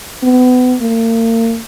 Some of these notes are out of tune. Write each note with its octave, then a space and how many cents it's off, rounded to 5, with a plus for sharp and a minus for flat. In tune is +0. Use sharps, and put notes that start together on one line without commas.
B3 +30
A#3 -40